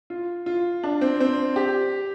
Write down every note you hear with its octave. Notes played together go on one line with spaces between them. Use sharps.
F4
F4
D4
C4
C4
G4